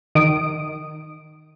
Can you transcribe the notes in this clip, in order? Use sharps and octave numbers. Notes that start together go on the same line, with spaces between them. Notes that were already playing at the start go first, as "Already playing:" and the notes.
D#3 D#6 D7